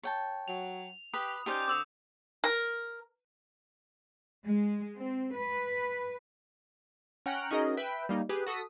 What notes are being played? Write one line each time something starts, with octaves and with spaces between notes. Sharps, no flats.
C#5 G5 A5
F#3 F7
G4 B4 D#6
C#4 D#4 G4 C5 D5 D#6 G6
D3 C4 D6 E6 F7
A#4
G#3
C4
B4
C#4 F#5 G5 A#5 F6 F#6
C#4 D#4 F#4 G#4 A#4 D#5
B4 E5 G5 B5
G3 A#3 D#4
G4 G#4 B4
F#4 A4 D#6 B6